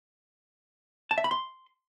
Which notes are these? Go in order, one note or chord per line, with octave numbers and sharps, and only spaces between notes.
A5
E5
B5
C6